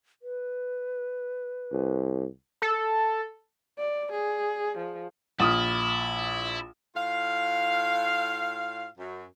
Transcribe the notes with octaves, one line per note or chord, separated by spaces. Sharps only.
B4
C2
A4
D5
G#4
F3
A#1 E4 D#6 F6
A2 F4 F5
F#2